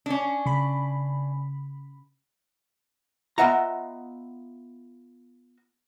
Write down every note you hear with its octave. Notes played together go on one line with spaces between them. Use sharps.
C#4 D4
C#3 B5
B3 F4 D#5 E5 F#5 A#5